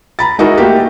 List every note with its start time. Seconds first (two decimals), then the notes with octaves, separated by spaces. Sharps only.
0.19 A#5 B5 A6
0.39 G#3 D#4 E4 F#4 A#4
0.58 A3 A#3 F#4 G4